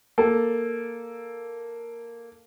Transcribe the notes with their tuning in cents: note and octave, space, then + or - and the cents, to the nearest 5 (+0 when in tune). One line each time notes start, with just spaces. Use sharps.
A#3 +0 A4 +0